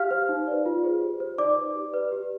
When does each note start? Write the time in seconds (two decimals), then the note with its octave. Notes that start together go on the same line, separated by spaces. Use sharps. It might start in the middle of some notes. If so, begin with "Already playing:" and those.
Already playing: G4 F5 F6
0.11 C5
0.29 D#4
0.47 B4 D5
0.66 F4
0.84 G#4 C5
1.01 G4
1.20 C5
1.38 D#4 D5 D6
1.56 B4 D5
1.75 G4
1.93 B4 D5
2.12 G4